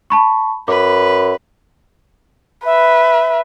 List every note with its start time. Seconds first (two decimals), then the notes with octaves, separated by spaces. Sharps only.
0.10 A5 B5 C#6
0.68 F#2 B4 D6
2.66 B4 E5